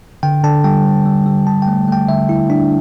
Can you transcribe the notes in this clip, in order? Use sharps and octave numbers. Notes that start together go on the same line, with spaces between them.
D3 G5
D3 A5
G3 G5
D3
G3
G3
D3 A5
G5
A3
A3 G5
D3 E5
D3 E4
D3 D4